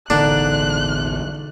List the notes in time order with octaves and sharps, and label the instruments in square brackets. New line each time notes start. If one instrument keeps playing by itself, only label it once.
[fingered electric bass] E1 A1 E2 [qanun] D3 D#4 A#4 [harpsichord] D4 [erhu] F#6